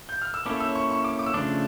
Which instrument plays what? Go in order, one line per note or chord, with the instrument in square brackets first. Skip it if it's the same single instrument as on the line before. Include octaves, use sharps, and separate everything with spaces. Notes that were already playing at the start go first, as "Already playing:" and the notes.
[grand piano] G6
F6
E6
[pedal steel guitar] A#3 C#4 E4 A4 C#5 [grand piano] D6
[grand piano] E6
C#6
C#6
D6
D6
E6
[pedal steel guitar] C#3 F3 A3 D4 [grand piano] D6